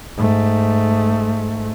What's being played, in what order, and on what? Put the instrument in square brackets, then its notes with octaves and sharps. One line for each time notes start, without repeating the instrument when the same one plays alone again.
[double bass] G#2 A3